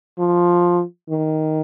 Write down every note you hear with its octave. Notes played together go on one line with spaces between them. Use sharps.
F3
D#3